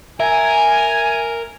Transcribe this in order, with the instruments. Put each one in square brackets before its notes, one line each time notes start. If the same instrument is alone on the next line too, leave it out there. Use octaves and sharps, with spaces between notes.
[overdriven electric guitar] A#4 [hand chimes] E5 [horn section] G#5